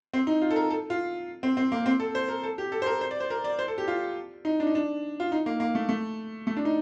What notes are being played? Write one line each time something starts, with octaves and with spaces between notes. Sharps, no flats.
C4
D#4
F4
A4
A#4
A4
F4
C4
C4
A#3
C4
A4
C5
A#4
A4
G4
A4
C5
A#4
C5
D5
C5
A#4
D5
C5
A4
G4
F4
D#4
D4
D#4
D4
F4
D#4
A#3
A#3
A3
A3
A3
D4
D#4